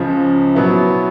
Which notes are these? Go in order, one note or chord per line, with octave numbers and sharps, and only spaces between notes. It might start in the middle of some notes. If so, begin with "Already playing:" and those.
Already playing: C#2 C#3 F3
B2 F#3 B3 E4